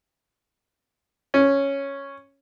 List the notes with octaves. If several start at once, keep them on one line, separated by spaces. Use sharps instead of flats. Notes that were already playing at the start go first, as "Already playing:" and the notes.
C#4